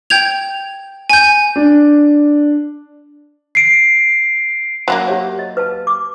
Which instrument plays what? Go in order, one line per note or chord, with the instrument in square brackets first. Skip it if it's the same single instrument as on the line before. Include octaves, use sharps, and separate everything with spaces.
[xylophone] G5 G6 G#6 F7
G#5 G6
[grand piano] D4
[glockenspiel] C7 D7
[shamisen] F#3 G3 A#3
[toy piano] G4 C#5 E5
D#5
B4 F5 A5
D6